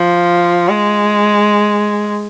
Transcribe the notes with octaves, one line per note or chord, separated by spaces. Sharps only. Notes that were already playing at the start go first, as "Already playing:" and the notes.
Already playing: F3
G#3